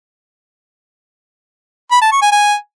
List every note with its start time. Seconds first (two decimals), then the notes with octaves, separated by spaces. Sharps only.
1.92 B5
2.02 A5
2.12 C#6
2.22 G#5
2.32 G#5